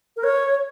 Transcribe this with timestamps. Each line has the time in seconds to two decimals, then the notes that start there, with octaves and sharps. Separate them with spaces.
0.17 A#4
0.24 C#5